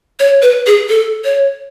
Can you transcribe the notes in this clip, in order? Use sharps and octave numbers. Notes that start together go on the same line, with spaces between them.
C#5
B4
G#4
A4
C#5